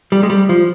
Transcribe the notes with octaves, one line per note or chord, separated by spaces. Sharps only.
G3
G#3
G3
F3